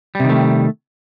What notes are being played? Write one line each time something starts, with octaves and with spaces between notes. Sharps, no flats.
C3 D#3 G3 A3